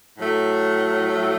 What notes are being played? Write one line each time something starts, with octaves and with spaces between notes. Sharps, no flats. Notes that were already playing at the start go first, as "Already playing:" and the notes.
A2 F#3 A3